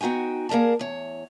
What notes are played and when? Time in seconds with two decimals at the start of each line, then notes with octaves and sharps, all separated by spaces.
0.01 B3 D#4 F#4 G5 G#5
0.49 A#3 G#4 A#4 D5 A5
0.79 E2 C#5